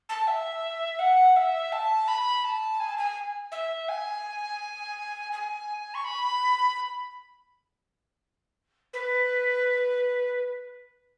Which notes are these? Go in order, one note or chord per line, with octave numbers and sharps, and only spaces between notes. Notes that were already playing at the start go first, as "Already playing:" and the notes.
A5
E5
F#5
E5
A5
B5
A5
G#5
A5
G#5
E5
G#5
G#5
C#6
B5
B4